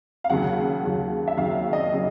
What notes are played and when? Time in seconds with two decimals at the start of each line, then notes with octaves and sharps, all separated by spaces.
0.24 F5
0.30 D#2 C#3 F#3 F#5
0.83 D#2 C#3 F#3
1.28 E5
1.37 D#2 C#3 F#3 F5
1.55 E5
1.73 D#5
1.91 C#3 F#3 D5